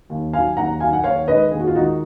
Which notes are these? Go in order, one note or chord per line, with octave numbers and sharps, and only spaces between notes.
D#2
D#3 F#3 F5 G#5
D#2 F#5 A#5
D#3 F#3 F5 G#5
F#5
D#2 C#5 F5
D#3 G#3 B4 D#5
D#2 G#4
F#4
F4
D#3 G#3 D#4 F#4